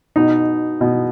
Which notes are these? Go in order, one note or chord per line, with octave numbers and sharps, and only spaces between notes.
B2 D#4
B2